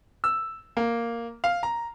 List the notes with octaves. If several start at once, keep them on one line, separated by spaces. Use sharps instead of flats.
E6
A#3
F5
A#5